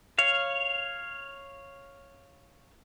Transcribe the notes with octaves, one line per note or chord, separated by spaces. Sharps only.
C#5 F5